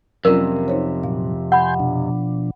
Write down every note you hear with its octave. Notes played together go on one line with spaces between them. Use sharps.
F2 C3 F#3 C#4 F4 A#4
D#4 C5 C#5
A#2 F#3 F5
F#5 G#5 B5 C6 G6
B2 F3 D4